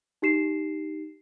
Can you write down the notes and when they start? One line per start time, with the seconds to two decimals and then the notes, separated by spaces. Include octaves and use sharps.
0.22 D#4 G4 C7 E7